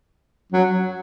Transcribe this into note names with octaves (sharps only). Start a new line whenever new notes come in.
F#3